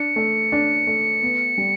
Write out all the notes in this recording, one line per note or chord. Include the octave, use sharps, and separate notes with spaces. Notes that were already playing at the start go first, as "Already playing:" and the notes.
Already playing: D4 C#7
A3
D4
A3
B3
G3